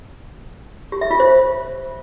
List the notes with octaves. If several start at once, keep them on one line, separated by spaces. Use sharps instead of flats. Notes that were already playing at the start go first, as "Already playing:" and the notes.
G4
E5
F4
C5